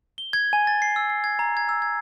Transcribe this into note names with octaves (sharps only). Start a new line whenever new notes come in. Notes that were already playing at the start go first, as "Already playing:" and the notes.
G7
G#6
G#5
A6
C7
E6
C7
G#6
A#5
G#6
E6
G#6